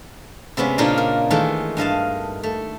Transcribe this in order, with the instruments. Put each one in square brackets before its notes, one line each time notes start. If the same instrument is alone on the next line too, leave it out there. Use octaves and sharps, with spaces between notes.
[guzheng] C3 G#3 B3 C#4
A#2 C#3 A#3 D4 D#4 F4
A#4
D#3 E3 G#3 A3
G2 D#5 F5 A5
A3